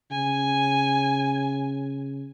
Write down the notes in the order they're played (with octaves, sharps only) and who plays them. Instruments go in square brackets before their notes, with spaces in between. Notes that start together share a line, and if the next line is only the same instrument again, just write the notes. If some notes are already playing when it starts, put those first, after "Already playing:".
[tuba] C#3 [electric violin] G#5